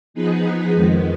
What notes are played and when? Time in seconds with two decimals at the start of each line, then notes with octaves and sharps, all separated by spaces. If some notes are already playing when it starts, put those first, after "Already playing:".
0.14 F3 B3 D#4 G#4 B4
0.74 F2 D#3 G#3 B3